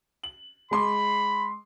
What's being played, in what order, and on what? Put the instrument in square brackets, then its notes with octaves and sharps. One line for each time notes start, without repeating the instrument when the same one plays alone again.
[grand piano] F#7
[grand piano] G#3 C6 D6 [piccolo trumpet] B5